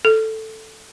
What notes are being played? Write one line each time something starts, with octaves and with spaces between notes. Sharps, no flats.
A4